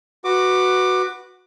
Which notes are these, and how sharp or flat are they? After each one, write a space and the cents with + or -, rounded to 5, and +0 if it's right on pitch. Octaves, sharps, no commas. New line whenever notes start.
F#4 +0 B4 +0 D6 +20